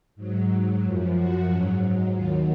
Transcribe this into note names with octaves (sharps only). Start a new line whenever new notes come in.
G#2 F#3
F#2 F3
F#4
G#2 F#3 C#4
D#2 D#3 F#3 F4